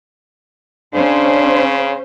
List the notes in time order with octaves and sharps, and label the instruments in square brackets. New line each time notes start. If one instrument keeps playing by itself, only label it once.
[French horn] C#3 [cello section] C#4 C5 [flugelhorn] D4